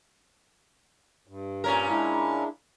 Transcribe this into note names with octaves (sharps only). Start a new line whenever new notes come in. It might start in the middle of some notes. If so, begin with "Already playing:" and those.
G2
A#2 C#4 A#4
G#3 D4 E4